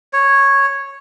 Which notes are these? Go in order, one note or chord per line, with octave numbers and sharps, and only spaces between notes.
C#5